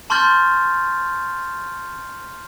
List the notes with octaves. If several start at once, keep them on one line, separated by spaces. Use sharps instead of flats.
A5 C6 C#6 F6 G6 A6